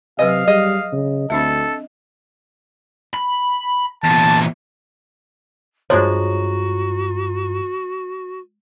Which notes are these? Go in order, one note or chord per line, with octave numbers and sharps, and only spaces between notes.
C3 F#3 B4 D#5 F5 G#5
G3 G#4 D#5
C#3
D2 C4 D4 A4 E5
B5
E2 A#2 A5
G2 F3 G#3 D4 F4 F#4 C#5 A#5